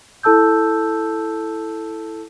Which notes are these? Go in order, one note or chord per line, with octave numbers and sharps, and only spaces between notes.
E4 A4 A5 E6 G6